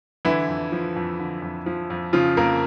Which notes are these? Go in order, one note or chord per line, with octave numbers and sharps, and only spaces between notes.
D3 E3 E4
F2
F3
F2
D3
F2
F3
F2
C#3 F3 F4
F2 A#3 A#4